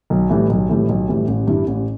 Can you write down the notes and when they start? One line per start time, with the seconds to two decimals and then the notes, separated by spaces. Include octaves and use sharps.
0.10 B1
0.29 A2 E3 G3
0.50 B1
0.69 A2 E3 G3
0.89 B1
1.08 A2 E3 G3
1.28 A1
1.47 G2 G3 E4
1.67 A1